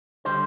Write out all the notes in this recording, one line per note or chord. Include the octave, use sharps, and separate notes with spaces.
D3 G3 C5